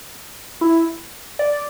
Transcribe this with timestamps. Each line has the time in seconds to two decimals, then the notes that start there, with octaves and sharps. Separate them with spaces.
0.61 E4
1.39 D5